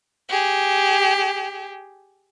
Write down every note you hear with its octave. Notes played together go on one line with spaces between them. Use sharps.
G4 G#4